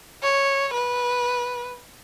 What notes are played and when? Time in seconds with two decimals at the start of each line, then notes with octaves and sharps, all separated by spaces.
0.23 C#5
0.74 B4